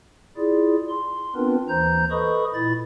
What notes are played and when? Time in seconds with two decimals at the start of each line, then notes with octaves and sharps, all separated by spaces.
0.37 E4 F4 G#4 D5
0.89 C6
1.36 B3 C4 D4 F4 A#4 B4
1.69 D#2 E3 C5 A#5 G6
2.11 A4 B4 D#5 B5 C#6 D#6
2.54 A#2 E4 B5 A6